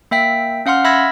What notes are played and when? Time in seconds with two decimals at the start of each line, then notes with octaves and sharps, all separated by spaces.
0.11 A#3 E5 G5 B6
0.66 C#4 F5 F#5 C6 F6
0.84 E5 B5 E6 G#6 A#6